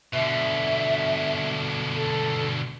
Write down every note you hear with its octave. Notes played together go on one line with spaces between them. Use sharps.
B2 D3 E5
A4